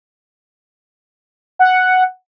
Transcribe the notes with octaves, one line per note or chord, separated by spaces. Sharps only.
F#5